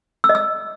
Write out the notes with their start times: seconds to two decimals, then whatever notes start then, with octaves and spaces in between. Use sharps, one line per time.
0.24 E6
0.29 D#5
0.35 E6